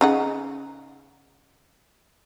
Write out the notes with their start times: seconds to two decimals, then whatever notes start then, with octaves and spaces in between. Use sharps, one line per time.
0.01 C#3 D#4 F#5